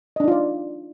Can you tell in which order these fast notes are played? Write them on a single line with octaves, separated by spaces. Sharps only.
D#5 D4 D#4 F4 D5